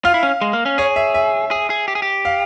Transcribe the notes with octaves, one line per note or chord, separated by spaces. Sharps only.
F4 F5
E4
C#4
G#3
A#3
C#4
G#4 C#5
E5
E5
G#4
G#4
G4
G#4
G4
F5